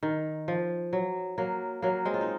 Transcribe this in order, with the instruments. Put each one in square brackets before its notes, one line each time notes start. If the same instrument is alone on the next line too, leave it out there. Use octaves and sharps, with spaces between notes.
[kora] D#3
F3
F#3
F#3 A#3
F#3 A#3
G#3 C4
F4
D#4